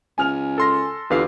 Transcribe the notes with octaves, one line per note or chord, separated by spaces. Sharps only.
C#2 G#5 F6 F7
A4 C6 A#6
E2 D3 F4 G4 B4 F5 C7